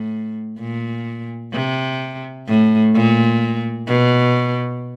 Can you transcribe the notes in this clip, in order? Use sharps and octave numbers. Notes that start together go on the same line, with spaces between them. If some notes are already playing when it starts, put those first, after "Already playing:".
Already playing: A2
A#2
C3
A2
A#2
B2